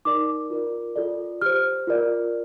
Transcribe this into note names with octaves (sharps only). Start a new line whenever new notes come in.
D#4 A#4 D5 D6
F4 A#4 D5
F4 A4 D5
G4 C5 F6
F4 A#4 D5